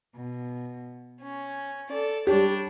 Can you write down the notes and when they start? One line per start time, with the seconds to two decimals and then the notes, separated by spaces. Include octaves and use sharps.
0.15 B2
1.20 C#4
1.88 A4 D5
2.27 G3 D4 G4 C#5